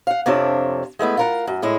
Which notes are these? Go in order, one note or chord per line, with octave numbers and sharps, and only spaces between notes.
F5 F#5
F2 C3 F3 D4 C#5 A5
G#3 A3 B3 E4
F4 A#4 F#5
F#2
A2 G#3 E4